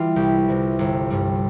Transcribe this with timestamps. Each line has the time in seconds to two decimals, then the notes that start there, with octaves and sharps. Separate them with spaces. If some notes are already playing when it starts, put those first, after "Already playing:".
Already playing: E3 G3 F4
0.16 C2 G4
0.48 C3 E3
0.79 G1
1.10 G2 G3